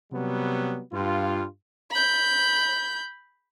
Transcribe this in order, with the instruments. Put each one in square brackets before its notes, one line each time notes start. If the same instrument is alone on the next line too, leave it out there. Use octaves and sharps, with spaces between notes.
[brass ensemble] C3 F#3 G3 B3
G2 F4
[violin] B5 G6